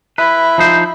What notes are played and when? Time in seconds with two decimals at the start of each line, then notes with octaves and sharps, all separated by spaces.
0.18 E4 B4
0.58 F3 D#4 C5